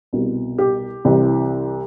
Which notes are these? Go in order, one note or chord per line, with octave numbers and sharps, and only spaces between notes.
C2 B2
G4
C2 C3 E3